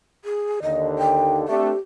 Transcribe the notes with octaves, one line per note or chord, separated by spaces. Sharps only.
G#4
D#2 D3 D#5
G5
A3 C4 D4 G4